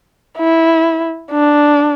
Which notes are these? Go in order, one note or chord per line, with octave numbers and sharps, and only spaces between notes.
E4
D4